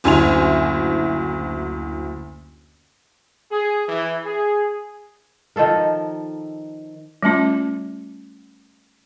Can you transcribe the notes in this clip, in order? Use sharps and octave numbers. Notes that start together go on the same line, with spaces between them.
F#1 D2 E4 G#5 C6 F7
G#4
E3
G#4
D#3 F3 A4 A#4
G3 A3 C#4 F4